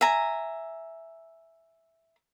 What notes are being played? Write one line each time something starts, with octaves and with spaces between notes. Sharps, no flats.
E5 G#5 A#5